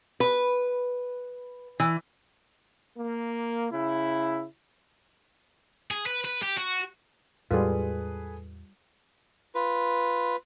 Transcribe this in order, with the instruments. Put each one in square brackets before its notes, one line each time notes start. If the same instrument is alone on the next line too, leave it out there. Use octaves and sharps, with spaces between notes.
[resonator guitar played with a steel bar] B4
E3
[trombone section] A#3
C#3 E4
[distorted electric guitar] G#4
B4
B4
G4
F#4
[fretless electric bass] E2 A2 G#3 [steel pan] G3 F4 [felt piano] G#4 A4 B4
[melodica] F4 B4